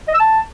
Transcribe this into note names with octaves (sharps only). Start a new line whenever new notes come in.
D#5
E6
A5